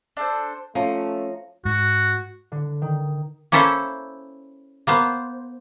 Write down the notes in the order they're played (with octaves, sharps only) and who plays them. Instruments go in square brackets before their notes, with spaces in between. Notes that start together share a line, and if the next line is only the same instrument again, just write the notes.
[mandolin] D4 A4 C5
[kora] F3 [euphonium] A3 [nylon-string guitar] C#4 [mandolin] A#5
[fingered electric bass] G#2 [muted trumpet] F#4
[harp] D3
D#3
[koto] A#3 C#4 E4 A4 C5 E5
A#3 B3 C5